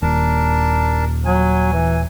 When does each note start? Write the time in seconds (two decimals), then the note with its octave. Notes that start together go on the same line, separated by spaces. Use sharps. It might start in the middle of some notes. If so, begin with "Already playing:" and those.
0.02 D#1 D4 A#4 A5
1.25 F#3 G#5
1.73 E3